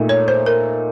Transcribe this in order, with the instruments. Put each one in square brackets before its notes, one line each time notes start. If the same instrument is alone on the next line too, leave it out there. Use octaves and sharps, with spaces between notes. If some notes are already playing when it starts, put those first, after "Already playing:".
Already playing: [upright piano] A#2 A3 D#4
[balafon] C#5
C5
A#4